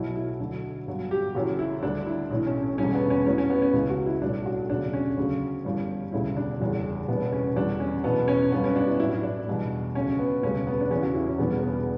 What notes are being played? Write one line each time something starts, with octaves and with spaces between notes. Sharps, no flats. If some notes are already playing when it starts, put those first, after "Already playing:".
Already playing: B1 B2 F#3 E4
E4
D2 D3 F#3
G1 G2 F#3
G4
F#1 F#2 E3 F#4
E4
D2 D3 G3 D4
E4
B1 A2 E3
C#4
C#4
E1 E2 D3 G3 C#4
B3
C#4
A1 A2 F#3 C#4
C#4
B3
C#4
C#2 C#3 E3
F#4
E4
B1 A2 G3 D4
F#4
E1 D2 C#3 F#3 D4
C#4
D2 C#3 F#3
G1 F#2 E3 G3
E1 D2 C#3 G3 E4
D4
F#1 E2 D3 G3
F#1 E2 B2 G3 B3
C#4
E2 D3 G3 D4
C#4
E2 B2 F#3 B3
C#4
G1 F#2 D3 G3 B3
C#4
D4
E4
A1 A2 F#3 E4
E4
D4
E2 B2 G3
D2 C#3 F#3 C#4
B3
E1 D2 C#3 G3 C#4
B3
D4
E2 C#3 E3 C#4
F#4
E4
C#4
E1 E2 D3 G3 B3
B3